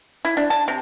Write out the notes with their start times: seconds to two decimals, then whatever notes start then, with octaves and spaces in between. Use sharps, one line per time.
0.25 E4
0.37 D4
0.50 A5
0.68 C3